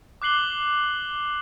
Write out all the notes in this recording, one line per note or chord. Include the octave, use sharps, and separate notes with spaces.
D6 F#6 C7 F#7 G7